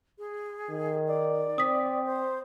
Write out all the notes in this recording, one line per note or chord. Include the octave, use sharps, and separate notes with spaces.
G#4
D#3
D5
C4 D#6 B6
C5